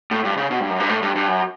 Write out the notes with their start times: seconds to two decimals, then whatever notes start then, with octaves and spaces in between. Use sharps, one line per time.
0.11 A2
0.25 G2
0.37 C#3
0.51 B2
0.60 G2
0.70 F#2
0.80 G2
0.89 A2
1.02 G2
1.16 G2
1.28 F#2